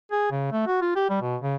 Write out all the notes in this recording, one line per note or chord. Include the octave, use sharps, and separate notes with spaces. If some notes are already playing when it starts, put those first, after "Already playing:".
G#4
C#3
A3
F#4
F4
G4
G3
B2
C#3